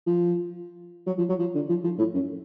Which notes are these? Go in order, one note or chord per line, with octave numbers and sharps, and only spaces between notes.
F3
F#3
F3
F#3
F3
D3
F3
F3
A2
F#2